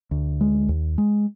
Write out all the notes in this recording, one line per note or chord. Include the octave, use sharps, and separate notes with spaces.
D2
G#3
D#2
G#3